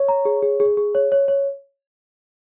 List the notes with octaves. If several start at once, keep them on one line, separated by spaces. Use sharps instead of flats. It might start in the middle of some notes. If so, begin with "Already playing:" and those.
Already playing: C#5
A#5
G#4
G#4
G#4
G#4
C#5
C#5
C#5